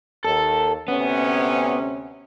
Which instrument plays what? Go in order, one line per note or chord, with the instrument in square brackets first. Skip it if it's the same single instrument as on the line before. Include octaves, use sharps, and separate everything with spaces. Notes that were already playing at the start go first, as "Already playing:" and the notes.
[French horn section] D#2 [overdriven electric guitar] A4
[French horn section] D2 C3 C#4 [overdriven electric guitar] B3